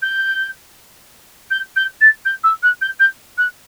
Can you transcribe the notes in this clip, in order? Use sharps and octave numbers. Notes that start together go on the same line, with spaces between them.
G6
G6
G6
A6
G6
E6
F#6
G6
G6
F#6